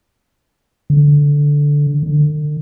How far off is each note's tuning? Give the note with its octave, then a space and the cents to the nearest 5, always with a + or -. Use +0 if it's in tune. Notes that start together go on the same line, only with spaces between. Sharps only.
D3 -10
D3 +35